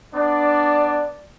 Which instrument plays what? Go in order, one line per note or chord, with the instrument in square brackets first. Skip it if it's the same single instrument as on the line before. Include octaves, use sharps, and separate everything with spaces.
[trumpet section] B3 D4 [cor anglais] D5